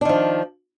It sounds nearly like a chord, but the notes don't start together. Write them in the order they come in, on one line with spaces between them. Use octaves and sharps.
D4 D#3 F3